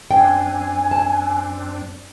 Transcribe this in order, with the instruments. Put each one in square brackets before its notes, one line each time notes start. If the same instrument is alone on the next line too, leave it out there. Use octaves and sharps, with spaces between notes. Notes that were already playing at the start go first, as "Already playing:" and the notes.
[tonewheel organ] F#2 C4 D4 [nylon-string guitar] G5 [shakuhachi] G#5
[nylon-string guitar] A5